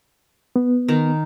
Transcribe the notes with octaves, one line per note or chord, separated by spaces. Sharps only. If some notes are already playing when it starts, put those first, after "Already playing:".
B3
D#3 A#4 A#5